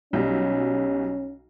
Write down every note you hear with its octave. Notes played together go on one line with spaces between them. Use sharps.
B1 F#3 G3 C#4